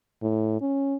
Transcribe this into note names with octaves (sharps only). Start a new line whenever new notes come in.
A2
C#4